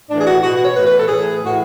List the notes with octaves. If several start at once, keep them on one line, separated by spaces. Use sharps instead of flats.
A2 E3 D4
G#4
F#4
B2 F#4
F#4
C#5
A2 E3 B4
B4
A4
A2 E3 G#4
A2 E3 F#4